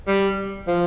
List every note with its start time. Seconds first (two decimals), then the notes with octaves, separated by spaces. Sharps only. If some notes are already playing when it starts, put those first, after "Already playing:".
0.08 G3
0.68 F3